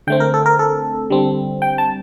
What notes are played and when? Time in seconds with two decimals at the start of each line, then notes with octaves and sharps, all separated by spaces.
0.07 D3 A3 C4 G5
0.20 A#4
0.34 A4
0.46 A#4
0.59 A4
1.10 D3 G3 C4
1.62 G5
1.78 A5